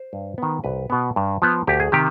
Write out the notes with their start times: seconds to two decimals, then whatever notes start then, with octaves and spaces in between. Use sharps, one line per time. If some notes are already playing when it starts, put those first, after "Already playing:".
Already playing: C5
0.13 G2
0.38 D#3 B3
0.64 C2 B4
0.90 B2 B3
1.16 G2
1.42 F3 B3
1.67 D2 G4
1.80 G#4
1.92 C3 D#3 G4